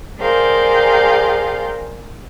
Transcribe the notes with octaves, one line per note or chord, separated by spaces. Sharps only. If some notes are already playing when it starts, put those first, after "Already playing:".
G#4 A#4 C5 D5 F5 G5